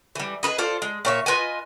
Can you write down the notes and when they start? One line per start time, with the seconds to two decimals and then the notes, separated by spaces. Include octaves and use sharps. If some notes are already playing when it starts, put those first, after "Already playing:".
0.15 E3 G3
0.43 G#4 A#4 B4 D#5
0.58 F4 A4 C5 D5
0.82 G#3
1.05 A#2 C#5 E5
1.26 F4 B4 D#5 G#5